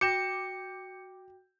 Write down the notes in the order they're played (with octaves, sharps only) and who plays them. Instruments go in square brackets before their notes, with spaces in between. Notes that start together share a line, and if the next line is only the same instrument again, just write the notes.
[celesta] F#4 G5 A#6 [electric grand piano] D6 G6 E7 [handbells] C#7